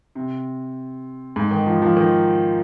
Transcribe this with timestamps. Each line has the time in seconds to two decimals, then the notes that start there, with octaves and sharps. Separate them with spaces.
0.15 C3
1.36 G#2
1.51 D#3
1.66 F3
1.82 F3
1.97 D#3